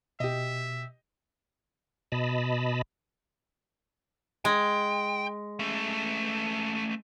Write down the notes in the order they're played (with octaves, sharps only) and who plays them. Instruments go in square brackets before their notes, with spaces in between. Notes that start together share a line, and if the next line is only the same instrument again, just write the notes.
[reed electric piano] B2 [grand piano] G4 D#5 [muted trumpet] E5
[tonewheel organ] B2 D#5 A5 B5
[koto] G#3 [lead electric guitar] G5
[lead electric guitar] A3 C#4